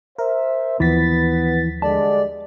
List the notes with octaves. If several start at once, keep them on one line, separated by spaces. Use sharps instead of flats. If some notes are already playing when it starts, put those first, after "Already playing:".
A#4 C5 E5
D#2 E3 F3 B3 A6 B6
D3 G3 G#3 D5 A5